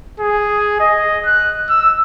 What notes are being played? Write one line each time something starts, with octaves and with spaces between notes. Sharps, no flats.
G#4
D#5
F#6
E6